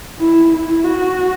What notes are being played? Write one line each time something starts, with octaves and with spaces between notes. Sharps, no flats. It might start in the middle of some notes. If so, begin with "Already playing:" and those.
E4
E4
F#4